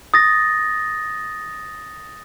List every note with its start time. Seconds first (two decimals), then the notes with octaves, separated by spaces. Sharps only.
0.14 D#6 A6 A#6